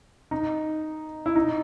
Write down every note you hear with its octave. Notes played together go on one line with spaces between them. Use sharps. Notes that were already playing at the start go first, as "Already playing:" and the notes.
D#4
E4
D#4